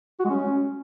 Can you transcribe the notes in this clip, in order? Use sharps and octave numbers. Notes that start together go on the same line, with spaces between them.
F#4
G#3
C#4